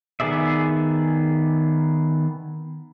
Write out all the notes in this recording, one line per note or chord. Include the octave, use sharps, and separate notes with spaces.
D#3 B3 G#4 D5 E5